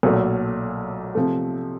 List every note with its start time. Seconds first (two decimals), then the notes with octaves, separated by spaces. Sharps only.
0.03 B1 A#2 F#3 A3
1.15 C3 F3 A3